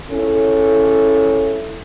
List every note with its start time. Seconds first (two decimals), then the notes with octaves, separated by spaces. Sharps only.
0.10 C#3 C#4 E4 A4